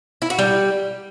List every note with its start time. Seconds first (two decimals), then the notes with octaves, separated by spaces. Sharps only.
0.22 E4
0.30 F#4
0.39 G3